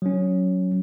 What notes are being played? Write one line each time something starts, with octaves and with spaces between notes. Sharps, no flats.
F#3 C#4